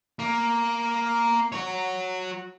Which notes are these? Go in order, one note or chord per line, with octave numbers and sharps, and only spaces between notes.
A#3
F#4 C#5